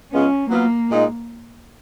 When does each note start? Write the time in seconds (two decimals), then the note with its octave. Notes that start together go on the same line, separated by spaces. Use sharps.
0.12 C#3 G#3 B3 C#4 F4
0.51 F#3 A#3 B3 F4
0.90 A#2 G#3 D#4